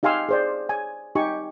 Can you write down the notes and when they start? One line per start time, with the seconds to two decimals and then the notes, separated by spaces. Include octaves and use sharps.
0.03 D#4 G4 F5 G#5 C6 E6
0.29 G#4 C5 D5
0.69 G#5
1.15 D#4 G4 G#5 C#6